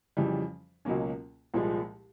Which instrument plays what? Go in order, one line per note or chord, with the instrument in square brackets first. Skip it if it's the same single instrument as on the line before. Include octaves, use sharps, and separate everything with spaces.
[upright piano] F2 C#3 E3 G3
C#2 B2 F#3 A#3 C#4
C2 A#2 F3 G#3